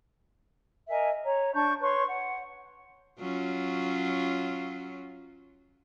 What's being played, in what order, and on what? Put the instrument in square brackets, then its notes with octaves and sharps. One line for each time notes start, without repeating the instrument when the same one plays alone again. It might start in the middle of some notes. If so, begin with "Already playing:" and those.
[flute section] A#4 D#5 E5 G#5
C#5 A#5
D4 A5 C#6 G6
B4 C#5 C6 C#6
F#5
[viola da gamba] F#3 C#4 F4